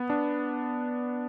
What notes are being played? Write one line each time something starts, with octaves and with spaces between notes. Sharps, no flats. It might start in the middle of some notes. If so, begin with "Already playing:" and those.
Already playing: B3
D4